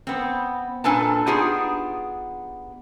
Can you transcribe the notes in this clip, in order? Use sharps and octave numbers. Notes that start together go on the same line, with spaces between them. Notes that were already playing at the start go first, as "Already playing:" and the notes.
B3 C4
A#2 D4 A4 B4 G#5 A5
B3 D4 D#4 F4 G4 G#4